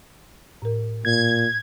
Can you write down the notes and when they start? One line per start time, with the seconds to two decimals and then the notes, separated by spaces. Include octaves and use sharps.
0.62 A2 A#4
1.05 A#2 G#6